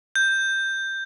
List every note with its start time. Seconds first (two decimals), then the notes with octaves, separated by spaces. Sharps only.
0.16 G6